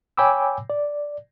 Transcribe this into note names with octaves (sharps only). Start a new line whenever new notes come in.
C#5 G5 G#5 B5 D6 E6
D5